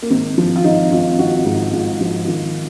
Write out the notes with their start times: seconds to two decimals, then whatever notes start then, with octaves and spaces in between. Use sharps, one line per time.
0.02 A#3
0.10 G#1 C4
0.38 F3
0.56 F4
0.64 G#1 D#4
0.92 G#1 F4
1.18 G#1 F#4
1.45 G#2
1.73 G#2 F4
2.01 F3 F#4
2.23 F#4
2.27 D#3 F4